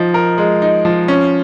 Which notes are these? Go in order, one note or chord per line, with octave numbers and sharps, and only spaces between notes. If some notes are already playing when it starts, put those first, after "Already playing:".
Already playing: F3 D#4
A#4
G#3
D#4
F3
C#4